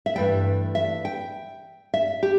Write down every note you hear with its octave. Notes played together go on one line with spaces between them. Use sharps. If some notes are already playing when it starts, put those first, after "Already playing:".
E5
G2 E3 A3 G5
E5
G5
E5
G4